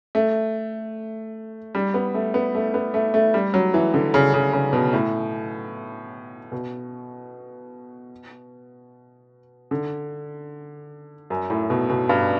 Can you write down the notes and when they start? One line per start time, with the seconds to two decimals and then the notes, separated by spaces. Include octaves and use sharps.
0.15 A3
1.75 G3
1.94 B3
2.14 A3
2.34 B3
2.55 A3
2.74 B3
2.94 A3
3.14 A3
3.34 G3
3.54 F#3
3.74 E3
3.94 D3
4.14 C#3
4.34 C#3
4.53 C#3
4.73 B2
4.93 A2
6.52 B2
9.71 D3
11.30 F#2
11.50 A2
11.70 B2
11.90 B2
12.09 G2